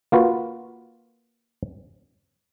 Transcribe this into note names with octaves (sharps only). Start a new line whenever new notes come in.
A#3 F4 F#4 B4